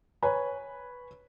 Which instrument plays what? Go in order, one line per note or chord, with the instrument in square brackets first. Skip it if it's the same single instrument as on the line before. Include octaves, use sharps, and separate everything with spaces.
[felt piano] B4 C#5 G#5 B5